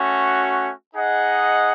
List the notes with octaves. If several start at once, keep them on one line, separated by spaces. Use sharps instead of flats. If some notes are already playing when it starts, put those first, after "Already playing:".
Already playing: A3 C#4 F#4
D#4 G#4 D#5 F#5